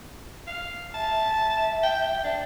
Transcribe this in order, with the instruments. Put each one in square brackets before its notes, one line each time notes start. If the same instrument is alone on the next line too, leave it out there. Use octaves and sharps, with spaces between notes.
[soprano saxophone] F5
[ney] E5 [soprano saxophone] A5
[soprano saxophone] G5
D4